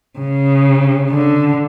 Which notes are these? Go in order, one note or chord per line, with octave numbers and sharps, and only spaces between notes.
C#3
D3